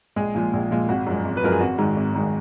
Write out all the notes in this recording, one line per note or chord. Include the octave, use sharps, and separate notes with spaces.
A#1 G#3 G#4
A#2 F3 G#3
A#1
A#2 F3 G#3
G#1 F#4
F#2 F3 G#3
G#1
B4
F#2 F3 G#3 A#4
G#4
G#1 F#4
G#2 D#3 G#3
G#1
G#2 D#3 G#3